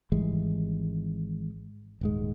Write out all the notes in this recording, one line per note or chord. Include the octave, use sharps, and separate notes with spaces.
G#1 E3 G3 G#3
D#1 G#2 G#3